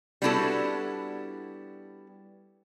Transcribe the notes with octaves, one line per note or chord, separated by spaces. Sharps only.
G3 B3 D4 E4 F#4 A4